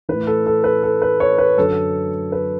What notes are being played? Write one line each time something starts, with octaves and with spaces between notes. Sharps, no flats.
A2 E3 B4
A4
A4
B4
A4
B4
C#5
B4
F#2 D3 A4
B4